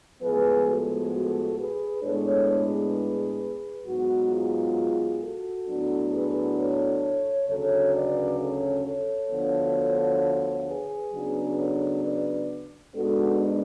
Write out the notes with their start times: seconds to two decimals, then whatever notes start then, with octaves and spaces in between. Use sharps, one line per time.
0.21 A2 F3 G#3 B3 G#4 B4
0.66 F#4 A4
1.12 F#4 A4
1.57 G#4 B4
2.03 A2 G#3 B3 D4 A4 C#5
2.49 G#4 B4
3.85 G#2 F#3 B3 F#4
4.30 F4 G#4
5.21 F#4 A4
5.67 A2 F#3 B3 D4
6.12 G#4 B4
6.57 A4 C#5
7.49 D2 C#3 F#3 C#4 A4 C#5
7.94 B4 D5
8.39 A4 C#5
8.85 A4 C#5
9.31 D2 D3 F3 B3
10.66 G#4 B4
11.13 C#3 F#3 B3 D4
11.57 A4 C#5
12.03 B4 D5
12.94 G#2 G#3 B3 D4 F#4 A4